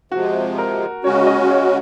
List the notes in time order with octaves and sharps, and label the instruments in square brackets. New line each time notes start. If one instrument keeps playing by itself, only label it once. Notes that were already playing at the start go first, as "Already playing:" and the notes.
[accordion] C3 F3 G#3 [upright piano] F#4
[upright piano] A#4
[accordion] C#3 G#3 C#4 F#4 [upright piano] C#5
[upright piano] D#5
C#5